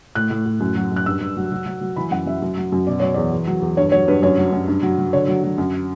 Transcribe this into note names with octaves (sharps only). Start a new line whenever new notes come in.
A2 F#6
A2
A2
F#2
F#3
F#2 F#6
G2 E6
G2
F#3
F#3
F#3
F#3
E3 B5
F#2 F#5
F#2 E5
F#2
F#3
F#2
B2 D5
F#3 C#5
E2 D5
E2
F#3
E2
G2 C#5
F#3 C#5
G2 B4
F#2 C#5
F#3
F#2
G2
F#3
F#3
D3 C#5
F#3
F#3
F#2